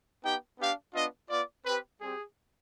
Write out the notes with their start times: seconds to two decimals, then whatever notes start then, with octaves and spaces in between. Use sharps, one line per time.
0.24 B3 D#4 G4 G5
0.58 B3 D4 G4 F5
0.94 B3 D4 F4 D#5
1.29 B3 F4 D5
1.65 C4 G4 B4
2.00 G3 C4 G4 G#4